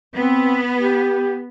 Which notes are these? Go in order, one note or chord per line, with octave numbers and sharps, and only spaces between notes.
B3 C4
G4